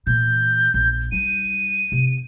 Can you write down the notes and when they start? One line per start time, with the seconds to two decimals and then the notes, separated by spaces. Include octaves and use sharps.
0.07 A#2 E3 G6
0.74 A#1
1.12 G3 D#4 D#7
1.92 C3